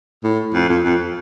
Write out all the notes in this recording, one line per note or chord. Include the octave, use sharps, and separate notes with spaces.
A2
F2
F2
F2